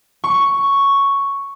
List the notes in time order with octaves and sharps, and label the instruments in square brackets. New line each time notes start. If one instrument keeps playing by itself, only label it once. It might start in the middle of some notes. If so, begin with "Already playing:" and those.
[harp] C#6